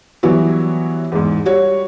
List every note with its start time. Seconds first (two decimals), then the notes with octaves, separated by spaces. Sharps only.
0.23 E3 F#3 G3 B3 E4 F#4
1.12 E2 G#2
1.46 G3 F#4 C#5